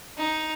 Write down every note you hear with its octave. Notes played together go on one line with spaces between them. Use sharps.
D#4